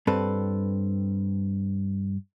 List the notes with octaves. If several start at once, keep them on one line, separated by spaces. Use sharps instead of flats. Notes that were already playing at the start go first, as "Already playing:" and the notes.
G2 C4 A4 B4